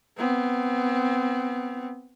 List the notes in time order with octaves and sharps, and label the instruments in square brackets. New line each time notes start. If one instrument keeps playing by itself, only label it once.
[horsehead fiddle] B3 C4